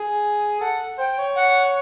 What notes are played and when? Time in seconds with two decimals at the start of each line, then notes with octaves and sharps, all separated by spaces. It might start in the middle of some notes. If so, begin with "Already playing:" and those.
Already playing: G#4
0.61 A4 F#5
0.98 C5 G5
1.18 C#5
1.36 F#5